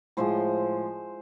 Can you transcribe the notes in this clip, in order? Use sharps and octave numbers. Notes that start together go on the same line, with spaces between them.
A2 F3 G#3 C5